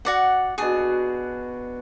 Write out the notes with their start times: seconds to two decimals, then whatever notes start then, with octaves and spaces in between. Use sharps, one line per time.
0.05 F#4 D5 F#5
0.58 B2 D4 F#4 G#4